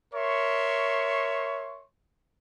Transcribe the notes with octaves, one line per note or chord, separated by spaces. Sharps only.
A#4 C#5 E5 C6 C#6